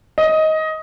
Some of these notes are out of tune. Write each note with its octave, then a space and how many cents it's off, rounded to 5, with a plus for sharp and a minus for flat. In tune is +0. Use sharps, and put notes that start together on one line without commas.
D#5 +15